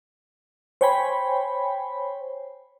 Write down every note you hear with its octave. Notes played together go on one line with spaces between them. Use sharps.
C5 C#5 G5 G#5 B5